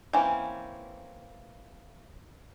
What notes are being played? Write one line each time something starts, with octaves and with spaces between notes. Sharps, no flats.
E3 A#3 C4 C#4